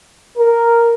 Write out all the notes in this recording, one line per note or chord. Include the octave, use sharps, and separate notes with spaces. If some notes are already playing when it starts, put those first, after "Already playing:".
A#4